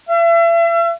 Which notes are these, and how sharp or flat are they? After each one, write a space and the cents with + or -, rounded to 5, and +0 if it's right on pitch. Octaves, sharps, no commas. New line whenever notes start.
E5 +40